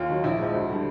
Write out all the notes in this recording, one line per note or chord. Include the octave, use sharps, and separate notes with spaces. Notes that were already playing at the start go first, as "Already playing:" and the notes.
Already playing: D#2 F4
D#3 F#3
A#1 E4
G#2 F3 G#3
D2
D3 G3